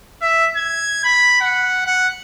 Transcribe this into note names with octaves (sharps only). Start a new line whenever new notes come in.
E5
G#6
B5
F#5
F#5